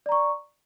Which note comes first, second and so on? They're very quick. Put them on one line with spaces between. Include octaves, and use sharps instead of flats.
D5 A#5 C#6